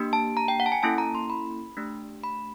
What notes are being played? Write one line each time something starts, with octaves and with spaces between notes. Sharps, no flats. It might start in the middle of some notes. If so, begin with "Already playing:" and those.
Already playing: A#3 D4 G4
A5
A#5
G5
F#5
A5
G#5
A#3 C#4 E4 A4 A5
A#5
C6
B5
A3 D4 G4
B5